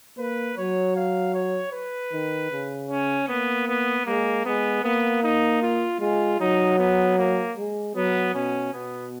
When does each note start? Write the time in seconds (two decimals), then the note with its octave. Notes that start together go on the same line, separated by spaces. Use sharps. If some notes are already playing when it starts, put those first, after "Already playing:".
0.17 A#3 B4
0.57 F#3 C#5
0.96 F5
1.34 C#5
1.73 B4
2.12 D#3
2.52 C#3
2.90 C#4
3.29 A#3 B3
3.68 B3
4.06 G#3 A#3
4.45 G#3 B3
4.84 A#3 B3
5.23 D#4
5.63 F4
6.00 G#3 F4
6.40 F#3 D#4
6.79 B3
7.18 A#3
7.57 G#3
7.95 F#3 B3
8.34 B2 C#4
8.73 B2 B3